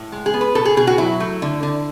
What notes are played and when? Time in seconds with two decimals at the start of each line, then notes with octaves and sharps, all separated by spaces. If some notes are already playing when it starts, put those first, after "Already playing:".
Already playing: A2
0.12 G#3
0.26 G#4
0.34 B3
0.41 B4
0.55 B2 A4
0.65 G#4
0.77 B2 G#4
0.87 F#4
0.98 F#3 E4
1.20 A3
1.42 D3
1.63 D3